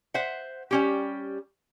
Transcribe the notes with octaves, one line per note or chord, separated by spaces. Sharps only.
C5 E5 F#5
G3 C#4 G4